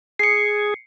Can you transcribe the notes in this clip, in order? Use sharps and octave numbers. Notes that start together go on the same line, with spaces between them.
G#4 C7 C#7